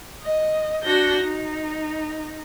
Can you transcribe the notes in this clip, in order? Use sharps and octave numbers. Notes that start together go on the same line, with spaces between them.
D#5
D4 F#4 G6 A#6
D#4